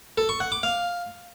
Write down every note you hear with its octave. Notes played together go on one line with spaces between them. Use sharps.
A4
C#6
F#5
D6
F5